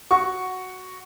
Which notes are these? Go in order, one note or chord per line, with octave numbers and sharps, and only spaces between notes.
F#4 C#6